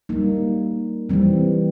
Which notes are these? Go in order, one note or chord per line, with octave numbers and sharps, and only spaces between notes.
G3 A#3 D#4
E3 G3 C4